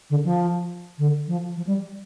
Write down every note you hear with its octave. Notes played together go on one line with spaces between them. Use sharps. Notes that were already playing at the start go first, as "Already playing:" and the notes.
D3
F3
D3
F3
F3
G3